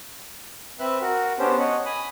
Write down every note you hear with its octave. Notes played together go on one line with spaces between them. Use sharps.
C4 B4 E5 F#6
F#4 A#4
B3 C#4 D4 G4 C5
C#5 D#5 F#5
G#5 B5 D#6